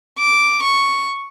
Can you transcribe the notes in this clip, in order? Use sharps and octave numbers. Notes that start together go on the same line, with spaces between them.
D6
C#6